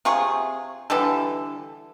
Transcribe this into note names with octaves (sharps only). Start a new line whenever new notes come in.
C3 F4 G#4 C#6
D3 E3 G3 A4